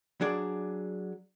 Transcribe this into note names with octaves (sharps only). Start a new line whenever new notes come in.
F#3 D4 G#4 D5